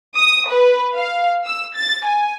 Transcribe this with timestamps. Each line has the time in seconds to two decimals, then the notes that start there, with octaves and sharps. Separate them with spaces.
0.16 D#6
0.48 B4
0.96 F5
1.46 E6
1.76 A6
2.06 G#5